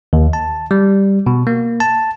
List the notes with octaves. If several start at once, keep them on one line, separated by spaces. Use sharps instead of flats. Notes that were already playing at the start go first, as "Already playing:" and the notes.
D#2
A5
G3
B2
A#3
A5